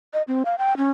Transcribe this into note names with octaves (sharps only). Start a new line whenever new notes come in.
D#5
C4
F5
G5
C#4